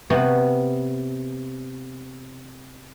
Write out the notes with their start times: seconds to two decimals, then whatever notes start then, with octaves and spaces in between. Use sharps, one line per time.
0.10 C3 B3 F#4